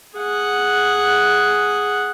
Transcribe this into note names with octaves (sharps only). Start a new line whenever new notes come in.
G#4 F#5